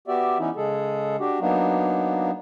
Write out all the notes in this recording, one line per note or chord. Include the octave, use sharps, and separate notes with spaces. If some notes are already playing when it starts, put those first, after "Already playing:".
B3 F#4 G4 D5 E5
E3 B3 C#4 D#4 E4
C#3 G#3 G#4 A4
D4 F#4 G4
F#3 A#3 B3 D4 D#4